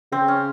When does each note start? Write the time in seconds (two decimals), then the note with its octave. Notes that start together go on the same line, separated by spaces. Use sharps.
0.12 C#3 C4
0.28 C#4